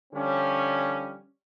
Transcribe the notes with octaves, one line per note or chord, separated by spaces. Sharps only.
D3 F3 G3 C#4